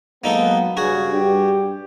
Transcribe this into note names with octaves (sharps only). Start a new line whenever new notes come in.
F#3 G#3 A#3 B3 D#4 A4
G2 C#3 F#4 G#4
G2 G4